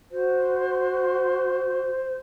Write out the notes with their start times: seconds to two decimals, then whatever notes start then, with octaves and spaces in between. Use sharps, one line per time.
0.11 F#4 C5